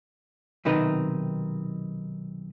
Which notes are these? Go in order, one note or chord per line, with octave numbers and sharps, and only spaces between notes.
B1 C3 D#3 C4 D#4 B4